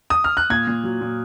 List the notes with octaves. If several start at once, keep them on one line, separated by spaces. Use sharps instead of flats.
D#6
F6
F#6
A#2 G#6
A#2
F#3
A#2